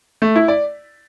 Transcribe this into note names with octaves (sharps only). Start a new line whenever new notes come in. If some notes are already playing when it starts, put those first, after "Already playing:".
A3
E4
D5